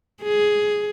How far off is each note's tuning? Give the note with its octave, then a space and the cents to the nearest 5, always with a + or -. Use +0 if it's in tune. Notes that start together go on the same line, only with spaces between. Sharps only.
G#4 +5